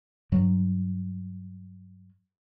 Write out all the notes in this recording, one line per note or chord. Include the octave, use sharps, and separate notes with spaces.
G2 F#3